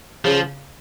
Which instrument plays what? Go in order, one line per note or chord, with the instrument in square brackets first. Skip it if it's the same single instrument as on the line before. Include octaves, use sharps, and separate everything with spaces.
[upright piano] C#3 [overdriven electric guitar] F3